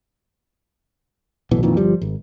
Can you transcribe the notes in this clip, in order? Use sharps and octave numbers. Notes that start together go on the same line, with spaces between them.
D1 B1 B2 E3
F2 A#2 D#3 E3
G1 F3 G3
G#1